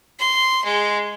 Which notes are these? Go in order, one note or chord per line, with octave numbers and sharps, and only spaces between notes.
C6
G#3